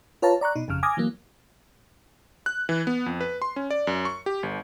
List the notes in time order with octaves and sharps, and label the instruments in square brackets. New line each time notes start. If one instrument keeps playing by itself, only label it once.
[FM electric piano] F4 B4 C#5 F5 A5 A#5
D5 A#5 C#6 F#6
B2 D#4
G1 F2 C#3 F6
G#5 D6 D#6 F6 G#6 A#6
E3 F#3 A#3
[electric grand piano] F#6
E3
B3
F2
B4
C6
C#4
D5
F#2
C#6
G4
G1